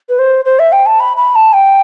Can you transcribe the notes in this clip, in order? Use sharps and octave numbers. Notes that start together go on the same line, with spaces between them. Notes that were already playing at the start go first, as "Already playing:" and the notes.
B4
C5
C5
E5
G5
A5
B5
B5
A5
G5